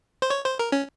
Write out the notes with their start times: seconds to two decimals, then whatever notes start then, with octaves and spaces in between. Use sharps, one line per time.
0.22 C5
0.30 C#5
0.45 C5
0.59 A#4
0.72 C#4